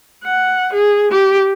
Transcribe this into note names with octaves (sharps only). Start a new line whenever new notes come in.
F#5
G#4
G4